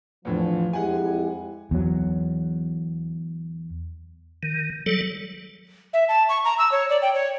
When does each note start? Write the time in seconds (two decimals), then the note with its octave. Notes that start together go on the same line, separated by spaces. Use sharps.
0.25 E2 A2 D3 F3
0.73 F2 G#3 E4 G4 F#5 G#5
1.71 E2 F#3
4.43 D#3
4.86 F#3 G3 A4
5.93 E5
6.08 A5
6.29 C#6
6.45 A#5
6.58 E6
6.72 C#5
6.90 D5
7.02 G5
7.14 C#5